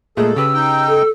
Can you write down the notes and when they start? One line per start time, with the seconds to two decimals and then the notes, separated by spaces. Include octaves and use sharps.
0.17 A#2 G#3 A3 G#4 A4
0.36 C#3 G4 B4 E6
0.54 D#4 G5
0.89 A4